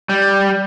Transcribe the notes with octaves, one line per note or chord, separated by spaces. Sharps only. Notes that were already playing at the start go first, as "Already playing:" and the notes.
G3